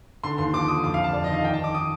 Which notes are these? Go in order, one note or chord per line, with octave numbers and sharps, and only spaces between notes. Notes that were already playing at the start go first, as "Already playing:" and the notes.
D3 C6
D#2 C6
F3 D6
D3 D#6
F2 D6
F5
F2
A5
F2 D5
D#5
D#3
F5
D#3 G5
A5
D#3
D6
D#6